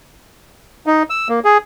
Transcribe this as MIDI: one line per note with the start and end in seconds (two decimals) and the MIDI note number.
0.87 1.03 63
1.10 1.28 88
1.29 1.40 58
1.45 1.58 68